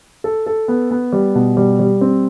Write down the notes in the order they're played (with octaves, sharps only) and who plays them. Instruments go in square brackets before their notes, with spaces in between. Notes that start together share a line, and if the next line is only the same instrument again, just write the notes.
[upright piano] A4
A4
B3
B3
G3
B2
G3
G3
C4